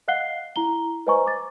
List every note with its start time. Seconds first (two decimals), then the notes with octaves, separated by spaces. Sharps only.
0.08 D#5 F5 F#5 F#6 C7 G7
0.56 E4 A#5 G7
1.07 B4 C5 D#5 G#5 A#5 C#6
1.27 D6 A6